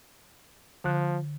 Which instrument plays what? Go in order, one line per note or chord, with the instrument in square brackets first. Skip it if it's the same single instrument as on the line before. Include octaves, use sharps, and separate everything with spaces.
[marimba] D3 F#6 [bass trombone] F3